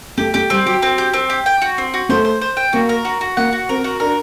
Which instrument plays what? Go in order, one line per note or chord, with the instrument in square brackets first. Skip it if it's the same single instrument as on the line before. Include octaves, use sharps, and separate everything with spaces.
[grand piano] A3 [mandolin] G4
[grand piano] A3 [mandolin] G4
[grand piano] G3 [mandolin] C4
[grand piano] F#3 [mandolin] G4
[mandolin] C4
G4
C4
G4
G5
F#4
C4
F#4
[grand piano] A3 [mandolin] C5
[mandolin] C5
C5
G5
[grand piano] A#3 [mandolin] F#4
[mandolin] A#4
F#4
F#4
[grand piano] A#3 [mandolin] F#5
[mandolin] F#4
[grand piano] C4 [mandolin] A#4
[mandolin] F#4
[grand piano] D4 [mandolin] A#4